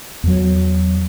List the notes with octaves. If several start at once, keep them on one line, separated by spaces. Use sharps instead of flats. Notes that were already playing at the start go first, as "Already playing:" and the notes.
E2 F#3